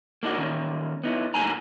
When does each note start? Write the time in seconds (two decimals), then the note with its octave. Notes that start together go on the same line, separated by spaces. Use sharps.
0.23 A#3 D4 D#4 F4 F#4
0.38 D#3 A#3 C#4
1.04 B3 D#4 E4
1.34 A2 F#3 A#3 D#4 G#5 A#5